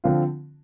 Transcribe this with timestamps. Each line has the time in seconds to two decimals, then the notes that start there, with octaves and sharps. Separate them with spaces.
0.04 D3 F3 C4 F4